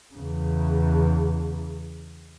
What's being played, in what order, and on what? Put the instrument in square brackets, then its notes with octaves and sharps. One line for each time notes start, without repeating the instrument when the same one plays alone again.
[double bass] E2 C#3